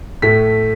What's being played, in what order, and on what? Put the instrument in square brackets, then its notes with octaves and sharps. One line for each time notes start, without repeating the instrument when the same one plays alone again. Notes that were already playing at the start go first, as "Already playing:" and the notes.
[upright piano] A2 A3 B6